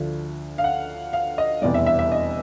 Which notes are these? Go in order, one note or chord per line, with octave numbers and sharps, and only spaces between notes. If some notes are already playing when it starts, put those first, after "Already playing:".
Already playing: D2 D3 F3
F5
F#5
F5
D#5
F1 E2 B2 G3 D5
E5
E5
E5
D#5